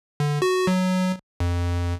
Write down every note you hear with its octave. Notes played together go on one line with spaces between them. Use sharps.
D3
F#4
F#3
F2